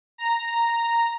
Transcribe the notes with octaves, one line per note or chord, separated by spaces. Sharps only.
A#5